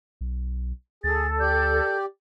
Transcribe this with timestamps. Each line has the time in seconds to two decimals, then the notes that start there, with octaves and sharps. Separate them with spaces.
0.21 B1
1.04 D2 G#4 A4 A6
1.40 G4 D5 G6